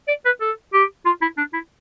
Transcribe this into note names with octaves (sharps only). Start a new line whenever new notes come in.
D5
B4
A4
G4
F4
E4
D4
E4